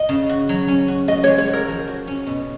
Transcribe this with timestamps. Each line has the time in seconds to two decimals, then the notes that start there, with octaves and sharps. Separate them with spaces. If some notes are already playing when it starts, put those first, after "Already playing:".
Already playing: D#5
0.09 C#3
0.29 F#4
0.49 F#3
0.68 C#4
0.88 F#4
1.08 F#4 D#5
1.24 C#5
1.28 G#3
1.38 C#5
1.47 F#4
1.53 A#4
1.68 F3
1.88 F#4
2.07 C#4
2.27 B2